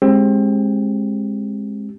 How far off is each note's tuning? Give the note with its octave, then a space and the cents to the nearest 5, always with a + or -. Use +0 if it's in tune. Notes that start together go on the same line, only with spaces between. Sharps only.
G#3 +0 C4 +35 G4 +0